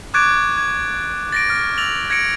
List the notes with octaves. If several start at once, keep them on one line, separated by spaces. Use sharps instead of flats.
C#6 D6 F#6 G#6 A6 D7
G#6
A6 A#6 D7
F6
E6 A6 A#6 F7 F#7
G#6 A#6 C#7 D7